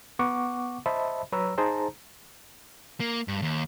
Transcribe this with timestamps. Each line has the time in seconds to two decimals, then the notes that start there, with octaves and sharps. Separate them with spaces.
0.19 B3 F#5 C#6 D6
0.86 C5 D#5 E5 A5 B5
1.32 F#3 B4 C#5 A#5 E6
1.58 D#4 G#4 C5 A5 A#5
3.00 A#3
3.28 G2
3.42 D#2